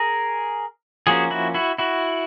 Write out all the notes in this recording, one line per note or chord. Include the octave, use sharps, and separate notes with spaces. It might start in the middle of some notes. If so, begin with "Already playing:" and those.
Already playing: G#4 A#4
F3 A#3 C#4 F#4 G#4
E4 F#4
E4 F#4
E4 F#4